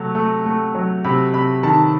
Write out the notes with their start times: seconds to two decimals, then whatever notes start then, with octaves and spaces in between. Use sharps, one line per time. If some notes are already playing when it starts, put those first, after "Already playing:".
Already playing: C3 F#3 A3
0.15 A3
0.46 A3
0.75 F#3
1.04 C3 B5
1.34 C3 B5
1.63 D#3 A5